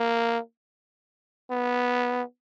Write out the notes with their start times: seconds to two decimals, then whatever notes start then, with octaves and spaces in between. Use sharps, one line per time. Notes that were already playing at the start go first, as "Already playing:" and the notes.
Already playing: A#3
1.51 B3